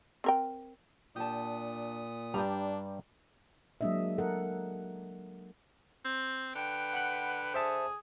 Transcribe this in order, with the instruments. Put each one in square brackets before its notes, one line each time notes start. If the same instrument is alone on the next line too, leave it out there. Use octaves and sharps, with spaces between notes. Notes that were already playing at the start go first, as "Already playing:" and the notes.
[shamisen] C4 A#4 G5
[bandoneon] A#2 D#6 [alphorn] D4 [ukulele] G4 A5
[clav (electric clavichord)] G2 G3 [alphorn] D4 [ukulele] G4 A#5
[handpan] F#3 G#3 A#3 D4 D#5 E5
A4 A#4 F#5
[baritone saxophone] C4
[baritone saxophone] D3 [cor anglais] B4 [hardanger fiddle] G5
[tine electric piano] F#5 B5 F#6
[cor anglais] G#4 [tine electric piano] C5 E5 A5